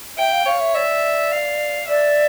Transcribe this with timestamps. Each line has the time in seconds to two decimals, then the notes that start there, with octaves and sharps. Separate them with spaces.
0.18 E5 G5
0.32 F5
0.46 C#5 F5
0.60 E5
0.75 D5 E5
1.32 F5
1.89 D5 E5